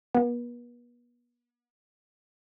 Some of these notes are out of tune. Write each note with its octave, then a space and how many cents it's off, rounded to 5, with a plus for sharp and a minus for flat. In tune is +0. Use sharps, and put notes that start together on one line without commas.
B3 -40